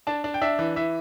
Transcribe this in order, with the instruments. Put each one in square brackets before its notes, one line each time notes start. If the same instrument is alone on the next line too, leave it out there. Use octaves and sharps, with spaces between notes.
[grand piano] D4 A5
D4
G5
D4 E5
E3
E3 E5